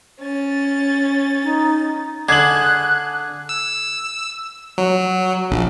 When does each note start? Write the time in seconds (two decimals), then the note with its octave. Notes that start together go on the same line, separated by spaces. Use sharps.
0.19 C#4 A6
1.44 D#4
2.29 D3 G#4 F#6 G#6 F#7
3.49 E6
4.78 F#3
5.51 A#1